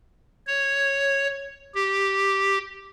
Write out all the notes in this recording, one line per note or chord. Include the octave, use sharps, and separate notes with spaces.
C#5
G4